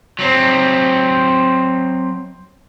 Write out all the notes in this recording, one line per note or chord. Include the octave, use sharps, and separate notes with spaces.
F#3 C4